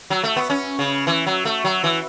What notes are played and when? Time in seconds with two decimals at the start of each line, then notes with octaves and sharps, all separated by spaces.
0.10 F#3
0.24 A3
0.36 B3
0.50 C#4
0.79 C#3
1.07 E3
1.26 F#3
1.45 A3
1.65 F#3
1.84 E3